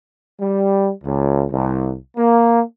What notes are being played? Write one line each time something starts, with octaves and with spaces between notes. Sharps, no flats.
G3
C#2
C2
A#3